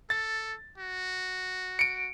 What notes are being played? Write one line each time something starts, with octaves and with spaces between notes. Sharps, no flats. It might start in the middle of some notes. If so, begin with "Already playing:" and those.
A4 A6
F#4
C#7 D7